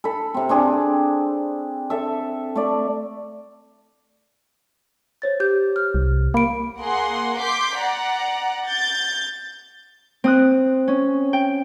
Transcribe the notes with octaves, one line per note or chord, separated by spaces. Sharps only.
A4 B5
C3 C4
C4 D4 G#4
A4 E5
A3 D5
C5 C#5 A6
G4 G6
F6
C2
A#3 B5 D7
A#3 G#4 F#5 C6
C6 D6 G6 B6
D5 F#5 A#5
G6 A6
C4 D#6 F#6
C#4
G5